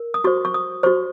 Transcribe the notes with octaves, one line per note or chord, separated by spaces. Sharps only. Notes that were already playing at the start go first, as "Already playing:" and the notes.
Already playing: A#4
D#6
F#4 C5 C#6
C#6
D#6
F#4 C5 C#6